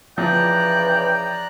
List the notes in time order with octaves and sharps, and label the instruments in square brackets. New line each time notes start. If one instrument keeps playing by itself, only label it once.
[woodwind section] C#3 E3 [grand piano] F3 [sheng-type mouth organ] D5 A#5 F#6 [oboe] G5